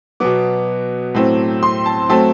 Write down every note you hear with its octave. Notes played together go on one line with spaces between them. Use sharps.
B2 F#3 B3 D6
A2 F#3 A3 C4
C6
A5
F#3 A3 C4 A5